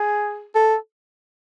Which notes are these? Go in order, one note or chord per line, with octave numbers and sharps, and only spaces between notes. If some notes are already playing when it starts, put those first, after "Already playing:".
Already playing: G#4
A4